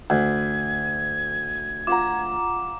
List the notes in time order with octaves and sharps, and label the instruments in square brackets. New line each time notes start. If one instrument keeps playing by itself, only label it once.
[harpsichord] D2 [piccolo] G#6
[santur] F4 F#5 A#5 [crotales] D6